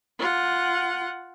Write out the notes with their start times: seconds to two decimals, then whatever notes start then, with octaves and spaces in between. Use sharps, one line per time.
0.19 F4 F#5